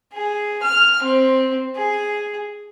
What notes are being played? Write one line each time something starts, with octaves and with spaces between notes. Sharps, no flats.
G#4
F6
C4
G#4